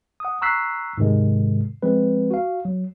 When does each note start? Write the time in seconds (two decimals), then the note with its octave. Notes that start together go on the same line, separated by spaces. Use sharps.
0.20 F#5 D#6
0.42 A#5 C#6 E6 F#6 B6 C7
0.98 G#2 C3 D#3 G#3
1.83 F3 G#3 C4 B4
2.31 F#4 F5
2.65 F#3